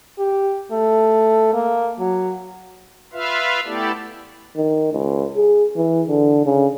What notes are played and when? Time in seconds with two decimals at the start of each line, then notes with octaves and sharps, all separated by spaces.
0.18 G4
0.71 A3
1.53 A#3
1.99 F#3
3.13 F4 B4 E5 F5
3.65 A3 B3 E4 G4 A4 D5
4.57 D#3
4.93 C#2
5.37 G#4
5.76 E3
6.08 D3
6.46 C#3